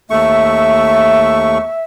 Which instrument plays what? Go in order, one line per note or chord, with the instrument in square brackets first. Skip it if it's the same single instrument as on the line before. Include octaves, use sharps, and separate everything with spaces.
[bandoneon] D#2 A3 C#6 [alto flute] E5